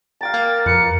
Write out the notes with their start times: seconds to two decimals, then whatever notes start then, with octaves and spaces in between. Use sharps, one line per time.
0.21 F5 G5 A#5 A6
0.34 A#3
0.66 F2 A#4 B4 C#7